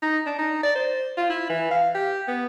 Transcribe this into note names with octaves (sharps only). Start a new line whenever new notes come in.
D#4
D4
D#4
D5
C5
F4
E4
E3
F5
G4
B3